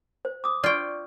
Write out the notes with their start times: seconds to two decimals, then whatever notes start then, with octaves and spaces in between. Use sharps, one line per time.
0.25 C5
0.44 D6 D#6
0.64 F4 D5 G5 C#6